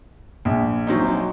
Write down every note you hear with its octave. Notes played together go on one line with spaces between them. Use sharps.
A#1
F#3 C4 D#4